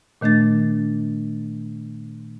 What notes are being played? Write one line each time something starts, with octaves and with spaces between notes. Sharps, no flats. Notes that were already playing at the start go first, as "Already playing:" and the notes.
A#2 D#3 A3 D4 A6